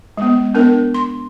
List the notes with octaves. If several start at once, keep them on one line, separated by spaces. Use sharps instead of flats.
G#3 B3
B3 D4 A#4
C6